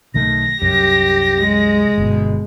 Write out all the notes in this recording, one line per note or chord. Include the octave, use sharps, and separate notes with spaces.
B1 D#3 A3 A#6
C2 F#2 G4
G#3
G1 B2